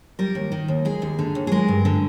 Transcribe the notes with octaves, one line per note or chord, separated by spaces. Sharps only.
G3 A#4
D#2
D#3
D#2
G#3 G#4
D#2
D3
D#2
G#4
G#3 A#4
G2
D3